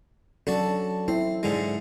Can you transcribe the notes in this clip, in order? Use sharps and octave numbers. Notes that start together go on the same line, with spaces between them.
F#3 C#4 D4 F#4 A4 D5
C4 E4
G#2 D3 G#3